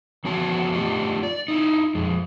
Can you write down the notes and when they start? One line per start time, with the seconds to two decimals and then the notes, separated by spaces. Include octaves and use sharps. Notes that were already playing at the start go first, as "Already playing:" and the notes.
0.25 E3 F3 B3 F#4 C#5 A5
0.73 A3 D4 F4 G4 D#5
1.23 D5
1.48 D#4 E4
1.95 F2 G#3